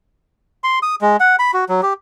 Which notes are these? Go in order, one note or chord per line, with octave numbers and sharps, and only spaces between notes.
C6
D#6
G#3
F#5
B5
F#4
F#3
G4